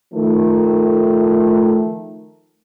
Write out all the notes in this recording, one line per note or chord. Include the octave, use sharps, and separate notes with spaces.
D#3 F3 A3